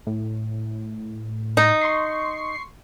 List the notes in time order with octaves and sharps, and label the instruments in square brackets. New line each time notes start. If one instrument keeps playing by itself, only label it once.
[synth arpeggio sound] A2
[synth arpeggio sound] A2 A#6 [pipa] D#4
[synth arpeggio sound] C6 C#6 C7